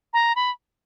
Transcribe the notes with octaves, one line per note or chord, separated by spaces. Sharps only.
A#5
B5